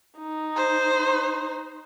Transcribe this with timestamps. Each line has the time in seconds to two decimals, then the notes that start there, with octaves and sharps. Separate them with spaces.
0.18 D#4
0.56 C5